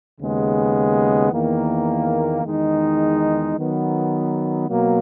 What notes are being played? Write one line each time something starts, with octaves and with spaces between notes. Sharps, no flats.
D#2 C#3 G#3 B3
E2 D#3 A#3
E2 D#3 G#3 D#4
D#3 F#3 B3
B2 F#3 A#3